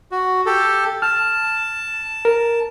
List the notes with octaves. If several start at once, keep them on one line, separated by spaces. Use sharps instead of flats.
F#4
G4 A4
A5 F6
A#4